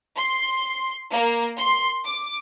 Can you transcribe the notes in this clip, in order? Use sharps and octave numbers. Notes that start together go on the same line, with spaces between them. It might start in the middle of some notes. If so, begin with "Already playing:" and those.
C6
A#3
C6
D6